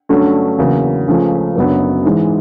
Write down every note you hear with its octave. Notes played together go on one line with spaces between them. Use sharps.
G2 D3 F#3 A3 C#4
E2 C#3 F#3 A#3
C#2 C#3 F3 A3
F#1 F#2 D3 F#3 B3
G#2 E3 G#3